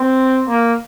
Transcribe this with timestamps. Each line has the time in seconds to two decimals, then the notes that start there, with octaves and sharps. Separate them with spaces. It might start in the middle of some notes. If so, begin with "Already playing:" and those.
Already playing: C4
0.49 A#3